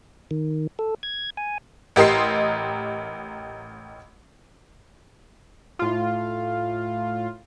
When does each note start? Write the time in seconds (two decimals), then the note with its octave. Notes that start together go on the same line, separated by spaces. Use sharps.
0.31 D#3
0.79 A4
1.03 G#6
1.37 G#5
1.96 A1 G4 A#4 D#5 C6 C7
5.79 A2 F4